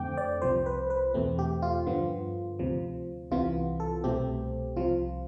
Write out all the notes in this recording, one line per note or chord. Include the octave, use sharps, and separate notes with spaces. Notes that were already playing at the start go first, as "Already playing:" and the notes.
Already playing: F2 D3 A3 C4 G5 D6
D5
C2 C3 F3 C5
B4
B4
E2 B2 A3 C4
G4
F4
G2 D3 F3 B3
D2 C3 F3
C2 C3 E3 B3 F4
A4
C2 B2 A3 C4 G4
C2 C3 F3 F4